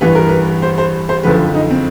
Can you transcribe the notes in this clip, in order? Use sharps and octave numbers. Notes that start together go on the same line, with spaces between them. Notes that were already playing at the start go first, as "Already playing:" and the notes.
A1 G2 E3 G3 B4
A#4
B4
C5
C5
C5
F#1 F2 D3 F3 B4
D#4
C4